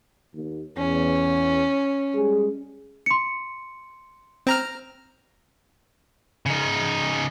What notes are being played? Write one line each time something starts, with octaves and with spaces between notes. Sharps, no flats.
D#2
E2 C#4
G3 G#3 G#4
C6 C#7
C4 A#5 F6
C#3 D#4